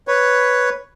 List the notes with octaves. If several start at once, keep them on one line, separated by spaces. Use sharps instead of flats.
B4 C#5